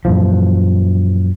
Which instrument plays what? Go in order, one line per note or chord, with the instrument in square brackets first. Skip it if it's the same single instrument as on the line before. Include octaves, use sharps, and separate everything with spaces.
[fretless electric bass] F#2 A#2 E3 F3